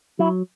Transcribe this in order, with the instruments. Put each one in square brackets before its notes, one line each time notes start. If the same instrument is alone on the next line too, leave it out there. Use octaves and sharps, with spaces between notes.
[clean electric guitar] F#3 E4